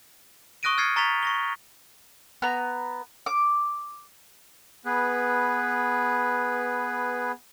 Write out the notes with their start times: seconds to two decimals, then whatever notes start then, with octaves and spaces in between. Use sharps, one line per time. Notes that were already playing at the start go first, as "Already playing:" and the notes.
0.63 C#6 D#6 F#6 A#6 D7 D#7
0.78 F6 G#6 A6 C7 C#7
0.96 A#5 C#6 A6 B6 F7
1.23 C#6 A#6 G7
2.42 B3 A#5
3.26 D6
4.85 B3 G#4 B4